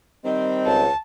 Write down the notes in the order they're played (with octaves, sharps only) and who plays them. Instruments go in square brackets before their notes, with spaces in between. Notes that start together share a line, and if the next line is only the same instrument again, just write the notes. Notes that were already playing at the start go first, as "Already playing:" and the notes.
[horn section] D#3 G3 C4 [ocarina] D#5
[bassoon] C#2 [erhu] A5